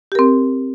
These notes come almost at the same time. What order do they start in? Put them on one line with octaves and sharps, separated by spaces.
G4 A#4 C4